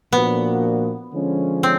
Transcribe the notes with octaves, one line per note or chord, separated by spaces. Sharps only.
A#2 F3 A#3 B3 D4 F#4
D3 F3 G#3 C#4
C4